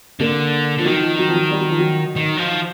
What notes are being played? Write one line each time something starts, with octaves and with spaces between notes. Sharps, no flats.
D3 A#3
D3 F3
D#3 F#3
F3
F#3
F3
F#3
G3
F#3
F3
F#3
D#3
F3